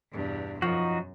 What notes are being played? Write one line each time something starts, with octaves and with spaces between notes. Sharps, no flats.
E2 G2 B2
F#2 F3 D#4 F#4